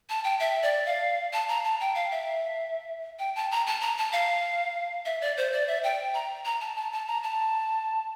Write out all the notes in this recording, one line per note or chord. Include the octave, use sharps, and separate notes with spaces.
A5
G5
E5
D5
F5
A5
A#5
A5
G5
F5
E5
G5
A5
A#5
A5
A#5
A5
F5
E5
D5
C5
D5
E5
G5
A#5
A#5
A5
A5
A5
A#5
A5